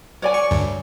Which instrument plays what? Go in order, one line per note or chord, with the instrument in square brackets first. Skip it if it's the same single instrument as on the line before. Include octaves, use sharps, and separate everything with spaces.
[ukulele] C#5 D5 G#5
[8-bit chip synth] C#6
D2 G2